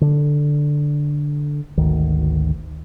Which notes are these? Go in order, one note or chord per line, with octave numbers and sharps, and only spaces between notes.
D3
G#1 D2 D#3